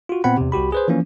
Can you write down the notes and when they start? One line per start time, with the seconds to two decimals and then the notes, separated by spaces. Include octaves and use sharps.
0.09 F4 F#4
0.24 A#2 B3 C4 F#5 B5
0.37 E2 C3
0.52 C2 F#4 G4 B5
0.72 G#4 B4 C5
0.88 E3 F3 A#3 C#4